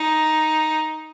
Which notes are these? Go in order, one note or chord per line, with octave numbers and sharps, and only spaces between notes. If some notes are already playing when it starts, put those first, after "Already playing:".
Already playing: D#4